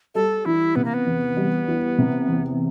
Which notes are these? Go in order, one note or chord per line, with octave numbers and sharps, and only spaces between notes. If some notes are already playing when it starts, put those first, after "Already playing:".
G3 A4
E3 E4
C3 B3
A#3
B3
E2
G3
E3
C3
E2